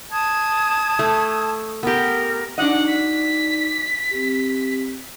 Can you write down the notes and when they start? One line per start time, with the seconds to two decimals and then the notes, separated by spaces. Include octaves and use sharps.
0.11 A5 D#6 G#6
0.99 A3
1.83 B3 G4 A#4
2.58 D4 D#4 F#4 D5 D#5 F#5 D6
2.87 B6
4.11 C4 G4